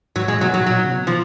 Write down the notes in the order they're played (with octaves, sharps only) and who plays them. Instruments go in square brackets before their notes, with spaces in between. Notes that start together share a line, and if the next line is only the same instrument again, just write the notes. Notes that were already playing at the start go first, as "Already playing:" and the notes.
[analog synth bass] G#2 [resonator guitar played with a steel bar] F#3
[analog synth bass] A#2 [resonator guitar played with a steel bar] G#3
[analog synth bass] B2 [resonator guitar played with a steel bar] F#3
[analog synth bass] A#2 [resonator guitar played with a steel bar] F#3
[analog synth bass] A#2 [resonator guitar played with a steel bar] F#3
[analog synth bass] C#3
B2
[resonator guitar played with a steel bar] F3